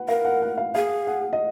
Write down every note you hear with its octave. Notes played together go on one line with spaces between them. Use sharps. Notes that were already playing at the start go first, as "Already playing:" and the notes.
Already playing: B4 F#5
A#4 F5
F#5
F#5
F5
G#4 F5
F#5
D#5